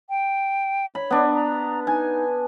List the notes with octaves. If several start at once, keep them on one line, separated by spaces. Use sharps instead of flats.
G5
C#5 B5
B3 D4
A#5
D#4 G#5